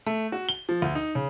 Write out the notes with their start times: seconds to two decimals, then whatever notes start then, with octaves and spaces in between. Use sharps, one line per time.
0.06 A3
0.32 F#4
0.49 G7
0.69 F3
0.82 D2
0.95 D#4
1.15 C#3